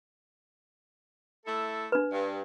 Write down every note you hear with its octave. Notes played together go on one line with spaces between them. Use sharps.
A3 E4 A4
D4 B4
G2